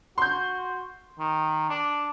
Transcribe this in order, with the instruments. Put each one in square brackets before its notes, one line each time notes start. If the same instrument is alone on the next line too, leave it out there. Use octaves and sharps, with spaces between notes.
[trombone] F#4 [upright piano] C6 G6
[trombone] D#3
D4